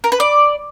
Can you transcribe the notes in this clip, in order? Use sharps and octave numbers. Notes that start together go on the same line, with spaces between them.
A#4
B4
D5